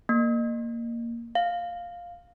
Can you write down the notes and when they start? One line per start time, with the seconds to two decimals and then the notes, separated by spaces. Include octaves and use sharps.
0.09 A#3
1.35 F5